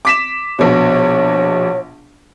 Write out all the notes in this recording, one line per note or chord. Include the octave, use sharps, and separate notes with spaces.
D6 B6 E7
A#1 B2 C#5